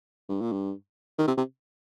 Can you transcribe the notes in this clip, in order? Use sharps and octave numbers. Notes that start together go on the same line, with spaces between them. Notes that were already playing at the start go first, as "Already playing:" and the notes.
G2
A#2
G2
D#3
C3
C3